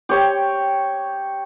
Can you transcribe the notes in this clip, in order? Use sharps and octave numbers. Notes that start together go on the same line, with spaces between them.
G4 C#5 G5